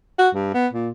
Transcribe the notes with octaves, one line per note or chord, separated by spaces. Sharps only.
F#4
G2
B3
A#2